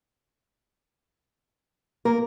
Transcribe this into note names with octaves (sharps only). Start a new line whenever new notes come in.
A#3 A#4